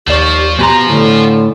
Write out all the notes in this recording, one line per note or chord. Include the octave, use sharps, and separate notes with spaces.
D#2 F3 G4 D5 C#6
B2 G4 B4 G#5 A#5 C6
A2 D3